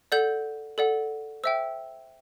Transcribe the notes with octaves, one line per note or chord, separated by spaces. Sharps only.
A4 D5 F#5 G6
A4 D5 F#5
C5 E5 G5 E6